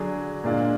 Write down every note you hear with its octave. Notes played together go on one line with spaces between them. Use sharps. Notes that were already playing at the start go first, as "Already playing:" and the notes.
Already playing: D3 F#3 D4 G#4
A#2 G#3 D4 F4